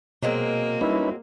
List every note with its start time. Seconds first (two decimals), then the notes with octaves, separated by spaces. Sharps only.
0.22 B2 F#3 G#3 A#3 C4
0.81 G3 C#4 D#4 E4 B4 E5